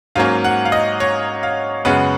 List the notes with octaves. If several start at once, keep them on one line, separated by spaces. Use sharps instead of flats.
G#2 F#3 A#3 C#4 F5
F#5
F5
D#5
C#5
F5
F#2 C#3 G#3 B3 F#5